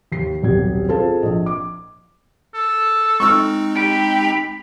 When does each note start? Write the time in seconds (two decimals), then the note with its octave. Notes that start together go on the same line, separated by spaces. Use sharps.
0.12 D#2 C7
0.42 D#1 B1 C3 G4 G#6
0.89 C4 F4 G#4 A4 C5 A5
1.23 A#1 D#5
1.46 D6
2.54 A4
3.20 G#3 C4 D#4 C#6 E6 F6
3.77 G4 B5